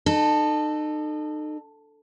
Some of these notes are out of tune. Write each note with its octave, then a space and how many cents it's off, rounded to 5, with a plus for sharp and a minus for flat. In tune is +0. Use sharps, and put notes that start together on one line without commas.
D#4 -35 A4 +0